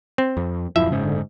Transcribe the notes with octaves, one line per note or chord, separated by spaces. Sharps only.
C4
F2
D#1 F#2 F3 E4 E5
F#1 G#2 C#3
D3